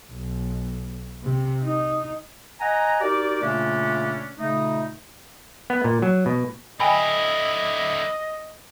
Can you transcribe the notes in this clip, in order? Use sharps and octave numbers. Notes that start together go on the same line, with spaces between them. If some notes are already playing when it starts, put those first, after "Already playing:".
B1
C3
D#4
D#5 F#5 G#5 A#5
D#4 F#4 G4 A#4 D5
A#2 C#3 A3 A#3 C#4 D4
A#2 C#3 A3 D#4
B3
A#2
F#3
B2
D3 E4 D#5 G5 G#5 B5